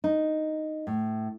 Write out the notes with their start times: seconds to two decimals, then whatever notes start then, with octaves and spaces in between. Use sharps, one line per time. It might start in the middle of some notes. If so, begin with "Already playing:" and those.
0.04 D#4
0.87 A2